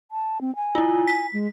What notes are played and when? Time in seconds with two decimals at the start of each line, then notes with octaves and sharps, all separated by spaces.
0.11 A5
0.41 C4
0.56 G#5
0.75 E4 F4
1.07 B6
1.33 G#3